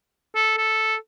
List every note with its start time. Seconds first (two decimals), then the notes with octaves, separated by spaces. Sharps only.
0.35 A4
0.57 A4